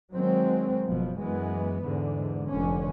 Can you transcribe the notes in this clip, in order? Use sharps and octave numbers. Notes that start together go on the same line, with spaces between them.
D#3 F#3 G#3 C4
F#1 B2 F3
F#2 E3 G#3 B3
E2 G#2 D3
F1 D3 C#4